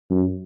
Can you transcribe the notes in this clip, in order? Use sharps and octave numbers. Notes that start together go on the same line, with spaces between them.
F#2